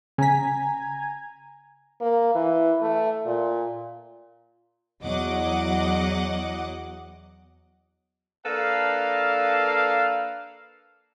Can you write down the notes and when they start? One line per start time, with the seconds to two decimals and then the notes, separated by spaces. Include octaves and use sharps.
0.18 C#3 G#5 A#5 G#6 B6
2.02 A#3
2.35 E3
2.82 A3
3.26 A#2
5.02 E2 F#3 D#5 F#5 D6
8.46 A#3 D4 A4 B4 F5